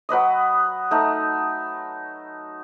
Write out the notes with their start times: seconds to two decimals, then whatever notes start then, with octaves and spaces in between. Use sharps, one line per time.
0.09 F#3 B4 D#5 D#6
0.91 A3 D#4